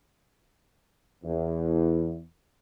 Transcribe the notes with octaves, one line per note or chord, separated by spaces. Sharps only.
E2